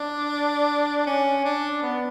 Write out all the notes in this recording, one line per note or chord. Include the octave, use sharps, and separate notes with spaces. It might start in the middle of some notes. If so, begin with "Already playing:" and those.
Already playing: D4
C#4
D4
B3